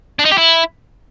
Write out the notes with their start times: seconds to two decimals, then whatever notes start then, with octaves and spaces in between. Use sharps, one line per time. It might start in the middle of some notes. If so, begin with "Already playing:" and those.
0.19 D4
0.25 D#4
0.32 G4
0.38 E4